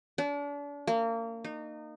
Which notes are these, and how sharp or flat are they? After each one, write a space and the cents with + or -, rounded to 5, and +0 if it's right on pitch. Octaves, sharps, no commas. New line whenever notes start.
D4 -35
A#3 -30
D#4 -25